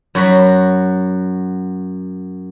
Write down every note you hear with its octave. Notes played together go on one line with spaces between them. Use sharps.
F#2 F#4 B5